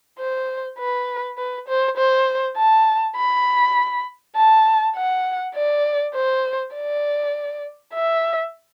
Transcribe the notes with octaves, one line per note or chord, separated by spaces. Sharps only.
C5
B4
B4
C5
C5
A5
B5
A5
F#5
D5
C5
D5
E5